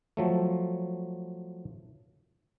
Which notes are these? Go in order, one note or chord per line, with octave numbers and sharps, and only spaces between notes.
F3 F#3 A3